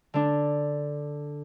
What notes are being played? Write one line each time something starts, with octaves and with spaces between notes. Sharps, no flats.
D3 D4